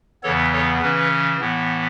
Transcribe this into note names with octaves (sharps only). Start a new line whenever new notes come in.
E2 C#3 E3 B3 A4 C#5
A4 C#5
C#3 E3 C#4 B4
A2 E3 B3